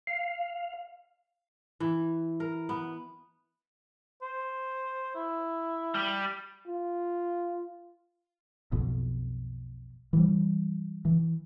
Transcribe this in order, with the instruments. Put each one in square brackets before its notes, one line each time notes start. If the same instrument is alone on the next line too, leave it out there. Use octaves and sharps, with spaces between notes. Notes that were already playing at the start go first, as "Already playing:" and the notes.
[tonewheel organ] F5
[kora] E3
A#4
B3
[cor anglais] C5
E4
[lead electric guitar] G3
[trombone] F4
[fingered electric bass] B1 F2 B2
E3 G3
E3